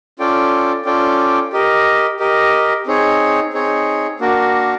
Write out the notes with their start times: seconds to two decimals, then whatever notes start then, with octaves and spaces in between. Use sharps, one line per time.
0.19 C#4 F4 A4 D5 G5
0.85 C#4 F4 A4 D5 G5
1.53 G4 A#4 D#5
2.20 G4 A#4 D#5
2.86 C4 D#4 G#4 C#5
3.53 C4 D#4 G#4 C#5
4.20 A#3 D4 F#4 A#4